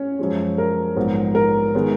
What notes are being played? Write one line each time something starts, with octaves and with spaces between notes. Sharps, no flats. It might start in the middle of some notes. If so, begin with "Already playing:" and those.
Already playing: C#4 C#5
F#2 F3 G#3
A#4
A#1 G#2 F#3 B3
A#4
D#3 G#3 B3